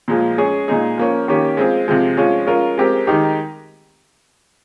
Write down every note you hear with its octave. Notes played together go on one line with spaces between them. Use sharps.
A#2 F3 G#3
G#3 C#4 G#4
A#2 G#3 D#4 G#4
F3 A#3 C#4
D#3 A#3 C#4 G4
G#3 C4 F4 G#4
C3 F3 G#3
F3 G#3 C#4 F4
G#3 C#4 F4 A#4
G#3 C4 G4 A#4
D#3 G#3 D#4 G4